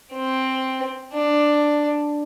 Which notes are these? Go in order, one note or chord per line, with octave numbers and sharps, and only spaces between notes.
C4
D4